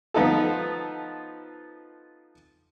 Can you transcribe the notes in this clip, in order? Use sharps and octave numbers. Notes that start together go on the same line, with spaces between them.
F3 B3 D#4 F4 A4